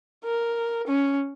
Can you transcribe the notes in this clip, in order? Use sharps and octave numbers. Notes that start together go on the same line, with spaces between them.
A#4
C#4